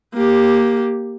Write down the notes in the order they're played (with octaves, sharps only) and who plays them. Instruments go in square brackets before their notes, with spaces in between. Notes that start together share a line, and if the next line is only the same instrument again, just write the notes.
[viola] A#3 G4